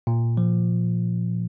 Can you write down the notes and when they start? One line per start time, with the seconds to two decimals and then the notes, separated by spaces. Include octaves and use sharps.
0.07 A#2
0.37 F3